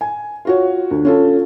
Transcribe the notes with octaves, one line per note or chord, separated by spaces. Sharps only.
G#5
F4 F#4 C#5
D2
C#4 F4 A4